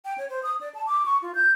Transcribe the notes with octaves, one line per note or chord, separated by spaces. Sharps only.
G5
C#5
C5
D#6
D5
A5
D6
C#6
F4
G6